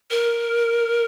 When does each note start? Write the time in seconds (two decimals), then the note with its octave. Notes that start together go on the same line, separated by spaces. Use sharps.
0.10 A#4